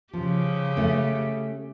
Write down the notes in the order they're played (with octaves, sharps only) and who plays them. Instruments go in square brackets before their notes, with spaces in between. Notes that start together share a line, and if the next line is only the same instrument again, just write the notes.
[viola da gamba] C#3 G4 [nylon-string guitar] F3
[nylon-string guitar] A3 C#4